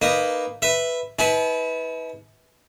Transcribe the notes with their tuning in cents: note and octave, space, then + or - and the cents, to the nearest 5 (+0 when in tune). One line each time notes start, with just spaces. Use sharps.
A#3 +0 D#4 -15 B4 +0
B4 +0 E5 +0
E4 -45 B4 +0 A5 -45